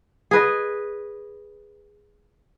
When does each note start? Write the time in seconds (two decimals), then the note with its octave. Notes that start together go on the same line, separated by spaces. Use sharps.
0.31 G#4 B4 D#5